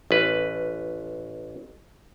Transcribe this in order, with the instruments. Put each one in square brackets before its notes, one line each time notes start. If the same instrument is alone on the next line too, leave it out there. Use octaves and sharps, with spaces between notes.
[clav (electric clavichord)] A1 B4